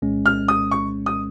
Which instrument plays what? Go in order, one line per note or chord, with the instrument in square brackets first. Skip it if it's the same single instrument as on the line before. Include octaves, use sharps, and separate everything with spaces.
[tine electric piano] C2 A#2 G#3 C#4
[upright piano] F6
D#6
C#6
D#6